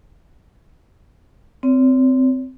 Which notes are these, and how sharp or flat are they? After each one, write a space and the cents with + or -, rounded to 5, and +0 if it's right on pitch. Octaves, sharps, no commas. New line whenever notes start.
C4 -10 C#5 +35